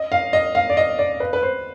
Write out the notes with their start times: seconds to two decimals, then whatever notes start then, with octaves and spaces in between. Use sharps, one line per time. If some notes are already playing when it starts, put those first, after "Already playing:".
Already playing: D#5
0.12 F5
0.33 D#5
0.55 F5
0.70 D5
0.77 D#5
0.99 D5
1.20 B4
1.33 B4
1.43 C5